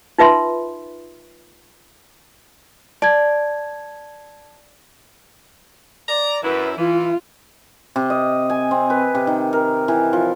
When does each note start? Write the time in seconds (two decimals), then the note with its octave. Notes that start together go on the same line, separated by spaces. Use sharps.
0.19 D#4 F4 B4 E5 B5 C6
3.02 D5 A5 G#6
6.08 D5 A#5
6.43 F#2 E4 B4
6.77 E3 F4
7.96 C3
8.10 D#5
8.50 G#5
8.71 C4
8.90 B4
9.15 C3
9.27 D#3
9.53 A#4
9.88 E3
10.13 F3